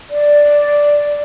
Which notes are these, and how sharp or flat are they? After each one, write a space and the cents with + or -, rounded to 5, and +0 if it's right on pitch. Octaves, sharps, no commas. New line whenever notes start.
D5 +0